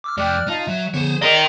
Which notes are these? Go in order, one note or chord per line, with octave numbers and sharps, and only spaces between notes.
D6 E6 F6
F2 A3 D5 G5 D6 F6 F#6
D#4 F4 F5 A5
F#3 E5 F#6
D3 F3 B3 G#4 C5 C#5
A#4 D5 D#5 A#5 C6 D#6